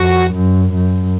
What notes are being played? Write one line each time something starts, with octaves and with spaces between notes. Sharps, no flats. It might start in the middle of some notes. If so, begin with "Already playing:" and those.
Already playing: F2 F#4
F#2
F#2